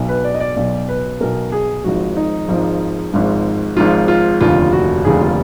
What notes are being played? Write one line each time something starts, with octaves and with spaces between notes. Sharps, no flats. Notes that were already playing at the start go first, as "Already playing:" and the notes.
Already playing: B1 B2
B4
D5
D#5
D5
B1 B2 D5
B4
B1 B2 A#4
G#4
G#1 G#2 F3 F#4
D#4
G#1 G#2 F3
G#1 G#2 F3
G#1 G#2 F3 F4
F4
F1 D#2 D3 F3 F4
F#4
F1 D#2 D3 F3 G#4
F4